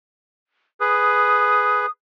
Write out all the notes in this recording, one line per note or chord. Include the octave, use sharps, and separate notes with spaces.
G#4 B4 D#6